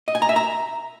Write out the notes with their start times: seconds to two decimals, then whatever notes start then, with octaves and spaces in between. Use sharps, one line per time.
0.08 D#5
0.15 G#5
0.22 A#5
0.29 E5
0.36 A#5